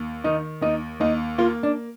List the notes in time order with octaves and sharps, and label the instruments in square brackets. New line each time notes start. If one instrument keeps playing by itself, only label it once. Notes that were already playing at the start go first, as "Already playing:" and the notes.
Already playing: [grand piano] D#2
[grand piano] D#3 [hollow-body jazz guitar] D#4
[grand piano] D#2 [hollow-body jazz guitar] D#4
[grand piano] D#2 [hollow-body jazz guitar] D#4
[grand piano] A#3 [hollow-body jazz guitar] F4
[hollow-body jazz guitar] D4